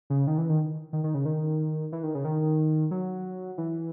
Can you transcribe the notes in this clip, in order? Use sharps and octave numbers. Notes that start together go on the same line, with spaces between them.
C#3
D#3
E3
D#3
D#3
D#3
C#3
D#3
E3
D#3
C#3
D#3
F#3
E3